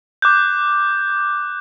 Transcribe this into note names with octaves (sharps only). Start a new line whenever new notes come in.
D6 F#6 G6